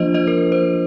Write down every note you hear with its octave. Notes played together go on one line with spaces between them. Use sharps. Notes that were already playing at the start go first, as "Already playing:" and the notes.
Already playing: F3 A#3 D4 F4 C5 D#5
C5 D#5
A#4
C5